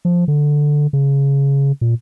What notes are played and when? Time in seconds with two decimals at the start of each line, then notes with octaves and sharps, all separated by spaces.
0.05 F3
0.28 D3
0.93 C#3
1.81 A#2